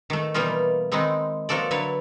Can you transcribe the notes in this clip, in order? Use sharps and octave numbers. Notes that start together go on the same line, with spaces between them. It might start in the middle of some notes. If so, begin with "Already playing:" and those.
D#3 A3
B2 E3 G3 A#3 D#4 F4
D#3 G#3 C4 D#4 E4
F3 A#3 F#4 A4 D5
D3 F#3 E4 B4 C#5